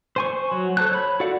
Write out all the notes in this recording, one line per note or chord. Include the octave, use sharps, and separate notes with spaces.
C5 G#5 C#6
F#3
A4 C5 A5 F#6
C#5 B5
F#4 A4 D5 F5 F#5